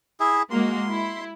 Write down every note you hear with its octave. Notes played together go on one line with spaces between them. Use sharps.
E4 G#4 E5
G#3 A#3 F#4 C6
E4